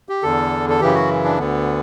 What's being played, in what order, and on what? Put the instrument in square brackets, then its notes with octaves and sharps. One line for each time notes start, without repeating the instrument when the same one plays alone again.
[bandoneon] G4
E2 D3 A4
A4
F#2 C#3 E3 G4
F#4
D4
D2 D3 B3